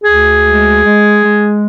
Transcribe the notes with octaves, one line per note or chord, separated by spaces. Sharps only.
D2 G#4
G#3
G#3
G#3